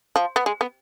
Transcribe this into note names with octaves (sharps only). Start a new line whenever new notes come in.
F3
B3
G#3
B3